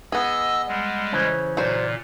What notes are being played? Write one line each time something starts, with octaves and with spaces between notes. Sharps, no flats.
B3 G#4 D#5 F#5 E6
G3 G#3
C#3 E3 C#4 C5
A#2 F#3 C5 D5